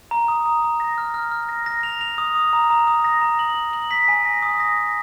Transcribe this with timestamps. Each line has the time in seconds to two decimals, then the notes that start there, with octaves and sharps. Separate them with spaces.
0.11 A#5
0.28 D#6
0.46 A#5
0.62 A#5
0.80 A#6
0.98 F6
1.14 F6
1.32 F6
1.49 A#6
1.66 A#6
1.83 F7
2.01 F7
2.18 D#6
2.35 D#6
2.53 A#5
2.70 A#5
2.87 D#6
3.04 A#6
3.22 A#5
3.39 F#7
3.56 F#7
3.73 F#7
3.91 B6
4.08 G#5
4.25 A#6
4.42 D#6
4.60 A#6
4.77 A#6